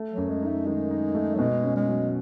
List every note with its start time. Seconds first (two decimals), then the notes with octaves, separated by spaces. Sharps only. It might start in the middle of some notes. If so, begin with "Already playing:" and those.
Already playing: A3
0.12 F#3
0.17 F#2
0.29 G#3
0.42 D#4
0.48 A3
0.66 D#3 G#3
0.90 D#4
1.14 A3
1.35 F#3
1.39 B2 G#3
1.64 C#4
1.76 G#3
1.88 F#3